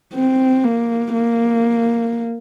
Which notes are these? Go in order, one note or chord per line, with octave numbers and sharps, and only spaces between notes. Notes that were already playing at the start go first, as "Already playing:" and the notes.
C4
A#3
A#3